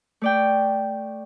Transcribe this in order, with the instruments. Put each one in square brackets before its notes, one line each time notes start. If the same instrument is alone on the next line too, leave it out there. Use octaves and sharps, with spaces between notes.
[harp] A3 D5 G5